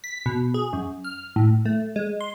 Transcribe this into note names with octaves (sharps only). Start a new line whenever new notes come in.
B6
B2
G#4
F#2
F6
A2
A3
G#3
C6